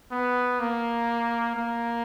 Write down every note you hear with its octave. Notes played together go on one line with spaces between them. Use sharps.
B3
A#3
A#3